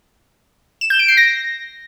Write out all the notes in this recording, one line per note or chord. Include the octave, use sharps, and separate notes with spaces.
E7
G6
D7
C7
A#6